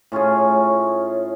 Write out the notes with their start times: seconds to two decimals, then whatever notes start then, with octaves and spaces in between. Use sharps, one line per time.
0.12 A2 C#4 F4 G#4